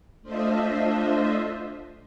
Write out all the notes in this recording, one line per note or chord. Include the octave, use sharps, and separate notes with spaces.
A3 D4 F4 C5 D#5 E5